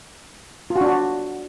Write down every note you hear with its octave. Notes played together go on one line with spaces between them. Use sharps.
F4
F#4
D4
F#4